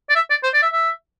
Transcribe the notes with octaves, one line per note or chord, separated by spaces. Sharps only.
D5
E5
D5
C5
D5
E5
E5